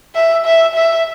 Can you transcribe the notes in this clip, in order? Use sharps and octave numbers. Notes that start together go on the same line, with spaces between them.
E5
E5
E5